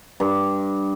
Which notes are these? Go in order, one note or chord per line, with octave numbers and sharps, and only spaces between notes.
G2